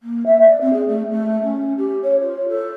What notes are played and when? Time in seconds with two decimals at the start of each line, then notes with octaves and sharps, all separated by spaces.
0.03 A#3
0.26 E5
0.42 D5
0.61 C4
0.73 G#4
0.88 A3
1.11 A3
1.43 C#4
1.77 G4
2.03 C#5
2.20 F4
2.48 A4